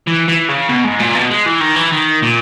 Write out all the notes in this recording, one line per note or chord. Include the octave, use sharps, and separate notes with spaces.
E3
E3
C#3
B2
G#2
A#2
B2
G#3
E3
D#3
E3
D#3
A#2